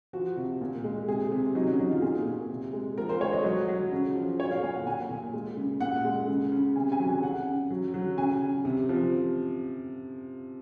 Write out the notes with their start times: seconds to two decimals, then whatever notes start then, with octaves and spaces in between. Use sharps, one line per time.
0.13 F3 F#4
0.37 C3
0.61 A#2
0.84 G#3
1.08 C3 G#4
1.32 C3
1.55 F#3 D#4
1.68 C#4
1.79 F#3 D#4
1.91 F4
2.02 A#2 G#4
2.27 A#2
2.50 C3
2.73 G#3
2.97 F3 A#4
3.09 C5
3.21 G#3 C#5
3.33 D#5
3.44 F#3
3.68 F#3
3.92 C#3
4.15 F3
4.39 F#3 C#5
4.51 F5
4.62 A#2 G#5
4.74 F#5
4.86 A#2 G#5
5.10 A#2
5.34 G#3
5.57 C#3
5.81 A#2 F#5
6.05 G#3
6.28 C#3
6.52 C#3
6.76 C3 G#5
6.92 G#5
7.00 F#3
7.07 G#5
7.22 C#3 F#5
7.47 C#3
7.70 F#3
7.94 F#3
8.18 C#3 G#5
8.41 C#3
8.65 C3
8.89 F3